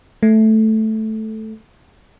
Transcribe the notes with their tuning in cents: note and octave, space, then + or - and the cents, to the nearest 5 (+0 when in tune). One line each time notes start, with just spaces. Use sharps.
A3 -5